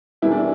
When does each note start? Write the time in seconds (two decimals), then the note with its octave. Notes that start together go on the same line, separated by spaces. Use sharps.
0.22 E1 E2 E3 G3 E4
0.32 D4